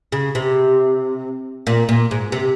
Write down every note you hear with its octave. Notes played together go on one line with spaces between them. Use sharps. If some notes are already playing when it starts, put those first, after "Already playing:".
C#3
C3
A#2
A#2
G#2
C3